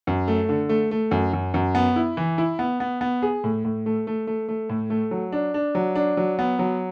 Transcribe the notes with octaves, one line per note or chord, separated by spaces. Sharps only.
F#2
A3
D3
A3
A3
F#2
F#2
F#2
B3
E4
E3
E4
B3
B3
B3
G#4
A2
A2
A3
A3
A3
A3
A2
A3
F#3
D4
D4
F#3
D4
F#3
B3
F#3